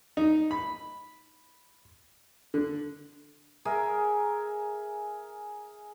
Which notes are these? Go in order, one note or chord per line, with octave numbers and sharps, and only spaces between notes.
D#4
B5
D3
G#4 A#4 E5